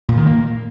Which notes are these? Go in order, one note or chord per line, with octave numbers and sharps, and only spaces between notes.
A#2
D#3
A#3